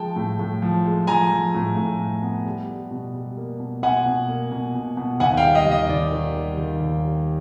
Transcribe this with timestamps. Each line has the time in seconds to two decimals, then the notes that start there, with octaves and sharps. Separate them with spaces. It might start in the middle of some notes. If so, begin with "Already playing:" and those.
Already playing: F3 G#3 G5 A5
0.16 A2
0.39 A2
0.62 F3
0.85 G#3
1.07 F3 G#5 A#5
1.31 F3
1.54 A2
1.77 A2
1.99 A2
2.22 B3
2.46 G3
2.68 G3
2.91 B2
3.14 G3
3.37 A#3
3.60 B2
3.83 B2 F#5 G#5
4.06 B2
4.28 A#3
4.52 B2
4.75 B2
4.97 B2
5.20 D#2 F#5 G#5
5.37 F5 G5
5.43 G3
5.55 D#5 F5
5.66 D#2
5.71 D#5
5.89 D#2 D5
6.12 D#3
6.35 G3
6.58 D#3
6.80 D#2
7.03 G3